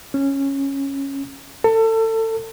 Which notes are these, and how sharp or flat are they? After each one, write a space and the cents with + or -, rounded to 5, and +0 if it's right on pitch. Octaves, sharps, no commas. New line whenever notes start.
C#4 -10
A4 +30